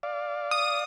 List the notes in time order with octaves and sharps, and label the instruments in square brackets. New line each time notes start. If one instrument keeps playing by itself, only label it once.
[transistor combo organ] D5 F5
[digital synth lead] D#6